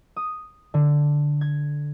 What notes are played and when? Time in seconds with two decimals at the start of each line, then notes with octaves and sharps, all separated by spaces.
0.16 D#6
0.74 D3
1.41 G#6